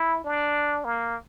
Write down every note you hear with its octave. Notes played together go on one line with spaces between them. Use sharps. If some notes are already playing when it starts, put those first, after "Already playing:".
Already playing: E4
D4
A#3